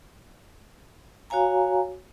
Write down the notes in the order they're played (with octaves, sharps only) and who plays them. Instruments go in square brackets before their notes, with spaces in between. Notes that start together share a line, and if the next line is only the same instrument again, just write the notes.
[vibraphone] F#4 C#5 F5 G#5 A#5